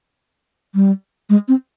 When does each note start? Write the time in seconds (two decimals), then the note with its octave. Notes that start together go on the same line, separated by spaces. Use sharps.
0.75 G3
1.30 G#3
1.48 C4